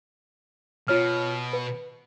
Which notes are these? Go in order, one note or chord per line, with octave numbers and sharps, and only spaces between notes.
B2 F4 C#5 F6
B4